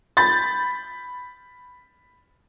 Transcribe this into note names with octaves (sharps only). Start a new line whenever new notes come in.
B5 G6 A6